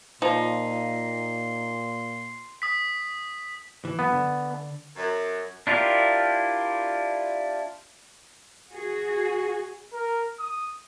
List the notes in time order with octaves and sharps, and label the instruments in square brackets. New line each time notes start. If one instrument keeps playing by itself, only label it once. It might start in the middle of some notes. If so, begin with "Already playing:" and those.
[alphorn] A#2 [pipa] F3 [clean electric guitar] D#4 [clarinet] C6
[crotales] D#6 B6
[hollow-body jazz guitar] E3
[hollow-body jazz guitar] F#2 [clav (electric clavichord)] B3
[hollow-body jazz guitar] D3
[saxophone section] F#2
[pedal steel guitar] D4 E4 F4 G4 A#4
[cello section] F#4 G#4
[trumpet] A#4
D#6